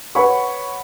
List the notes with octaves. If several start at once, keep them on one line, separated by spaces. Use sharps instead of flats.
B4 C#5 F#5 B5 C#6